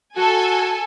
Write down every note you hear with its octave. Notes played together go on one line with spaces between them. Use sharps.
F#4 A4 G#5